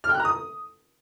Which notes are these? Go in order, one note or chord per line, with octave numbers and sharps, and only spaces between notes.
F6
G5
F#6
A#5
D#6